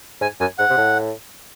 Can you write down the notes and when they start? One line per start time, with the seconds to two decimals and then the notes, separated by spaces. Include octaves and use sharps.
0.21 G#2 G#5
0.40 F#2 G#5
0.58 G#2 F#5
0.70 C3
0.77 A2